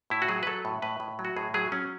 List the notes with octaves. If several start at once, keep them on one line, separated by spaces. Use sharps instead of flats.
A2 E4
F#4
F#3 G#4
B4
F#3 A4
A2
A2 B4
A2
F#3
F#4
A2 G#4
F#3 G#4
F#3 C#4